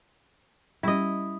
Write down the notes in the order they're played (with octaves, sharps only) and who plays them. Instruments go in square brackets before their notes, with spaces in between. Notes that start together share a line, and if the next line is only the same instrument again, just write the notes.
[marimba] G3 C#4 G4 [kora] E4 D#5